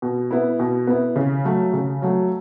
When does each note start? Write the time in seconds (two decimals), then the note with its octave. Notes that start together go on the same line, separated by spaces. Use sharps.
0.02 B2
0.31 B3 E4
0.59 B2
0.87 B3 E4
1.16 C#3
1.44 F#3 A3
1.73 C#3
2.02 F#3 A3